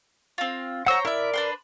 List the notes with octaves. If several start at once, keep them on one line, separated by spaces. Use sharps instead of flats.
C4 F4
C5 C#5 F#5 A#5 E6
E4 A#4 D5 E5
D4 B4 C6